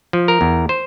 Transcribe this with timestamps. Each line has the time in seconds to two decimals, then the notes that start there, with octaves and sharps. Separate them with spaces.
0.13 F3
0.28 A#4
0.41 E2
0.69 C5